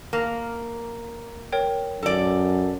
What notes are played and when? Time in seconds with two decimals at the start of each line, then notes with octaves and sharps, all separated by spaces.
0.13 A#3
1.52 A#4 C#5 G5
2.02 F#2 A4 D5